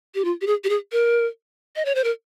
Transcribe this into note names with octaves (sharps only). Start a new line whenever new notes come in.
G4
F4
G4
G#4
G4
G#4
A#4
D#5
C#5
C5
A#4